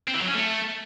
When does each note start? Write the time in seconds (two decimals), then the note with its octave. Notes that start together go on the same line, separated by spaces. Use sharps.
0.08 C4
0.15 E3
0.21 F#3
0.28 C#4
0.35 A3